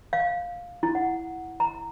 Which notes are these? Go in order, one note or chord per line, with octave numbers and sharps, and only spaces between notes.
F5
E4
F#5
A#5